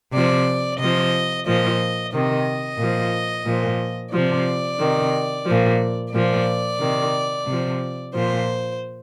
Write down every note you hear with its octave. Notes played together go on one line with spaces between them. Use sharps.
C3 F3 D5
C3 F3 D#5
A#2 F3 D#5
C3 D#3 D#5
A#2 F3
A#2 F3
C3 F3 D5
C3 D#3
A#2 F3
A#2 F3 D5
C3 D#3
C3 F3
A#2 F3 C5